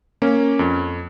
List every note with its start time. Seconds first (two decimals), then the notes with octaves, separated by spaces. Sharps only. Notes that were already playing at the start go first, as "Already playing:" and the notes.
0.22 A#3 C#4
0.59 F2